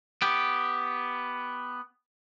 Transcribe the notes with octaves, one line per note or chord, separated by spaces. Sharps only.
B3 G4